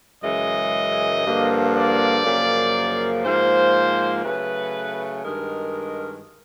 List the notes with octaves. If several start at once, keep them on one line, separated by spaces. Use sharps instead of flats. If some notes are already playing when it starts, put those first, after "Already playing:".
F#2 C#3 E3 G#3 D#5
G2 D3 F3 A#3
D5
F#2 C#3 F3 A#3
G#2 F3 A#3 C5
C#3 F#3 A3 B4
G2 D#3 G#3 A#4